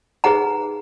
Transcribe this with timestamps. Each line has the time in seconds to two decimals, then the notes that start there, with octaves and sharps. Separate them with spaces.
0.24 D#4 G#4 B4 F#5 A#5